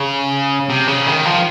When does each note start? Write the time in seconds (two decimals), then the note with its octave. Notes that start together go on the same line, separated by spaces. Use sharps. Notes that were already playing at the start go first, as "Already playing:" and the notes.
Already playing: C#3
0.70 C3
0.88 C#3
1.07 D#3
1.26 F3